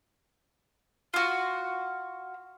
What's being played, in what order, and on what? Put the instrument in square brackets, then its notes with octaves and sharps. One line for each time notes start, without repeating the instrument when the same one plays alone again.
[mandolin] F4 F#4